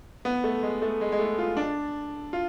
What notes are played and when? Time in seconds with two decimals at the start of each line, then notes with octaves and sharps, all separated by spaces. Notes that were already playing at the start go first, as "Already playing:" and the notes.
0.25 B3
0.44 A3
0.63 G#3
0.82 A3
1.01 G#3
1.12 G#3
1.19 A3
1.38 F4
1.57 D4
2.33 F4